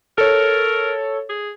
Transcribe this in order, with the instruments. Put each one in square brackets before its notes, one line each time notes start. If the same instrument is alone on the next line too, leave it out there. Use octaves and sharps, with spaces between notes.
[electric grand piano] A4 C#5 [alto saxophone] A#4
[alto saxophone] G#4